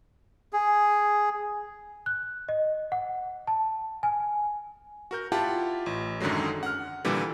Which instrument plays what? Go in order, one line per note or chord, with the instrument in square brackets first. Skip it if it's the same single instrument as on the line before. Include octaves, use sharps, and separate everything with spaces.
[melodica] G#4
[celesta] F#6
D#5
F#5
A5
G#5
[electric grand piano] F#4 A#4 G6
E4 F4 G4 F#5 A5
A1
F#2 D3 D#3 F#3 G#3
F#5 F6
A#2 D3 E3 G3